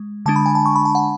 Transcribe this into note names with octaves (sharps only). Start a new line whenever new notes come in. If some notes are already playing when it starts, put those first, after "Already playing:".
Already playing: G#3
D3 G#3 D4 A5
B5
G#5
A5
C#6
B5
A5
F#5